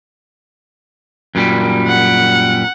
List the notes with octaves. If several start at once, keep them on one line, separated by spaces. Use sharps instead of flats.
F#2 A#2 G3
F#5